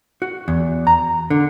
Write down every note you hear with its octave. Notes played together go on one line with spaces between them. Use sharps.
F#4
E2
A#5
D3